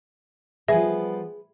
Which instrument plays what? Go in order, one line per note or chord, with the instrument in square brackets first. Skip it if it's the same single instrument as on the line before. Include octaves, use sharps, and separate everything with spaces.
[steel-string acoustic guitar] F3 G3 [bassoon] B3 [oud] G#4 [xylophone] E5